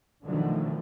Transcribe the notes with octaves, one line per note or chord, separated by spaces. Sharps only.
B2 D3 D#3 F3 F#3 A3